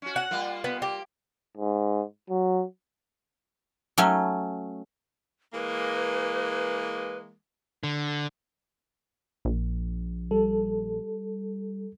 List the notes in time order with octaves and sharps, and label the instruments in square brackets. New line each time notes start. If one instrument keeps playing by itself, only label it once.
[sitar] C#4 F#4
[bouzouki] F#5
[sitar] G3 A#3 F4
[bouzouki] B3
G4
[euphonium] G#2
F#3
[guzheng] F#3 A3 C#4
[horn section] E3 G#3 A#3 [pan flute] B4
[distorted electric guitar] D3
[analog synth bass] A#1
[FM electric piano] G3 [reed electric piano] A4